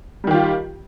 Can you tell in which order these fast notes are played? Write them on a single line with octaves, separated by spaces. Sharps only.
G3 D#3 G4 F4